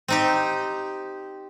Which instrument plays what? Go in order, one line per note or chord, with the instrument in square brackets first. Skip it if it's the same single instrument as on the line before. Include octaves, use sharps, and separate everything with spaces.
[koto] C4 D#4 G4